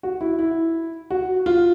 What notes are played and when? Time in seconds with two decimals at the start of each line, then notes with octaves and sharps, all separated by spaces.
0.03 F#4
0.21 E4
0.39 E4
1.10 F#4
1.46 F4